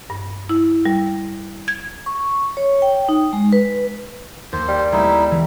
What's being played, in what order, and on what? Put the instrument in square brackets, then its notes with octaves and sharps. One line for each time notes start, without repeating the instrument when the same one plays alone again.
[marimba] G2
E4
G3
G#6
[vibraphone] C#6
C#5
G5
D#4
G#3
B4
[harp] D#2 [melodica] C5
[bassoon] G3
[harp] G#3 A3 B3 [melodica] D#4 E4
[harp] E3